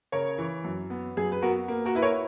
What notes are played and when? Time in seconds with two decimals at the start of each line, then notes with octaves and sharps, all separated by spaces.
0.12 C#3 A#4 C#5
0.38 E3
0.64 F#2
0.90 B3
1.17 F#2 G#4
1.32 B4
1.42 B3 F#4 A#4
1.68 A#3
1.85 F#4 A#4
1.95 E4 B4
2.02 A#4 C#5